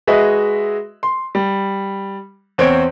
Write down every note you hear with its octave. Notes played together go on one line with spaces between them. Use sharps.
G#3 F#4 G#4 B4 D#5 E5
C6
G3
E2 C4 C5 C#5 D7